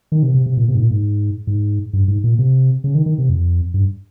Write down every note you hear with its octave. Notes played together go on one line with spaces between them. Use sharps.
D#3
C3
C3
C3
A#2
C3
G#2
A#2
G#2
G#2
G2
G#2
A#2
C3
C#3
D#3
D#3
C3
F2
G2